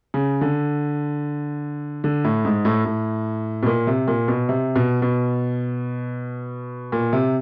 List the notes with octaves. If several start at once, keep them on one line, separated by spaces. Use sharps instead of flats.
C#3
D3
D3
A2
G#2
A2
A2
B2
A#2
C3
A#2
B2
C3
B2
B2
A#2
C3